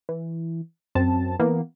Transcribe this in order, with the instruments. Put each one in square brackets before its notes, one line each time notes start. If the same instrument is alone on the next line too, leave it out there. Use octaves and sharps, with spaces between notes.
[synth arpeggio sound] E3
F#2 C4 A5
E3 A#3 B3